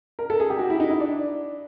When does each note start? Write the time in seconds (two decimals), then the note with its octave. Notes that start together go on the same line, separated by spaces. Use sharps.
0.19 A#4
0.30 A4
0.40 G#4
0.50 G4
0.59 F#4
0.70 E4
0.80 D#4
0.90 E4
1.00 D4